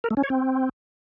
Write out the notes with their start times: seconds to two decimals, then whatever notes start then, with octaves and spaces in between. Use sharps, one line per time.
0.04 A#4
0.11 A3
0.17 C#4
0.23 C#5
0.30 C4